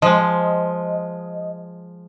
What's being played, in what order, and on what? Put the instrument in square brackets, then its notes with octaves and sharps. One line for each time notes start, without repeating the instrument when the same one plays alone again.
[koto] F3 G#3 [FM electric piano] D#5